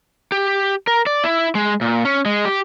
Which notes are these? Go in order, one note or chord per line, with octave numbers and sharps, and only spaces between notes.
G4
A#4
D5
E4
G#3
A#2
C#4
G#3
G4